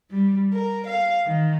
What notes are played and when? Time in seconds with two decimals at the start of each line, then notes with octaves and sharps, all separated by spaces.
0.10 G3
0.52 A#4
0.86 F5
1.26 D#3